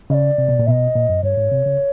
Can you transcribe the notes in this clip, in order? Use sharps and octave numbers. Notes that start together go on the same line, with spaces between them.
C#3 D5 D#5
C3
B2
A#2
B2 D#5 E5
A#2
F#2
G2 C#5
G#2
C3
C#3